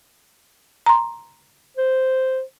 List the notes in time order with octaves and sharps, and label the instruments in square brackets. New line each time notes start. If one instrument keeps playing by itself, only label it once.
[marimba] A#5 C6
[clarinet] C5